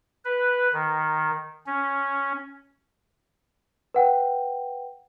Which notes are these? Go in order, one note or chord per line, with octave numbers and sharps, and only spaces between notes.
B4
D#3
C#4
B4 F#5 G5